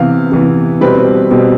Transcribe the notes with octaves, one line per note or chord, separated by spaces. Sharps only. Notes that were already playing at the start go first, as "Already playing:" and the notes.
Already playing: C3 E3 B3 F5
C3 E3 B3
B2 G3 C4 B4
B2 G3 C4